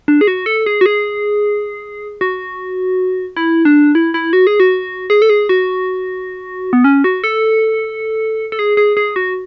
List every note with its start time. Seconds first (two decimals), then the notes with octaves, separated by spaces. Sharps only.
0.08 D4
0.21 G#4
0.27 F#4
0.46 A4
0.66 G#4
0.81 F#4
0.86 G#4
2.21 F#4
3.37 E4
3.65 D4
3.95 E4
4.14 E4
4.33 F#4
4.47 G#4
4.60 F#4
5.10 G#4
5.22 A4
5.29 G#4
5.49 F#4
6.73 B3
6.84 C#4
7.04 F#4
7.24 A4
8.52 A4
8.59 G#4
8.77 G#4
8.97 G#4
9.16 F#4